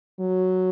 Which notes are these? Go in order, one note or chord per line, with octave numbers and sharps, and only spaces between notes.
F#3